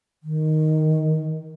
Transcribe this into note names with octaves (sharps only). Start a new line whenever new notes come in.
D#3